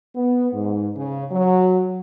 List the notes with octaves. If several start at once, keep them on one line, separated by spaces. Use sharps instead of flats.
B3
G#2
C#3
F#3